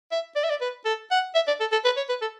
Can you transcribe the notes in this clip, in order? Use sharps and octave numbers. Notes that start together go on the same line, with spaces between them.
E5
D5
E5
D5
B4
A4
F#5
E5
D5
A4
A4
B4
C#5
B4
A4